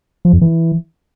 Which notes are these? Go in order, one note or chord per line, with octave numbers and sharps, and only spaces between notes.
F3
F2
E3